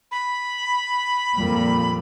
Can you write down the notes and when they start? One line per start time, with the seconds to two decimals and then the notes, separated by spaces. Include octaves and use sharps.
0.12 B5
1.36 F2 A#2 G3